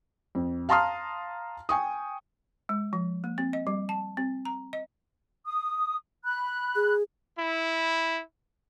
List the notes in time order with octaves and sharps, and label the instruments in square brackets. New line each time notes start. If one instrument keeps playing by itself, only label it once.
[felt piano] F2
F5 A5 A#5 C6 D#6 F6
G5 G#5 C#6 D#6
[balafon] G#3
F3
A#3
C4
D#5
G3
A5
C4
A#5
D#5
[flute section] D#6
B5 F#6
[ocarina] G#4
[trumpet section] E4